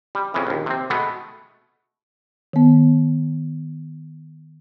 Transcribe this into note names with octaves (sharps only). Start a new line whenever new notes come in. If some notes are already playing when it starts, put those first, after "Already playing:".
G3
F2 C#3 E3
A#1 D#2
C3 C4
B2 G#3 A3 B3
D#3 B3